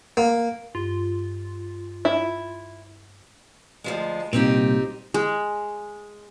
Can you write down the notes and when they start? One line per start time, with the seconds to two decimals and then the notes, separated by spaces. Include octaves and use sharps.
0.17 A#3
0.75 G2 F4
2.05 E4
3.84 D2 F3 G#3
4.33 C2 A#2 C4 D#4 G4
5.14 G#3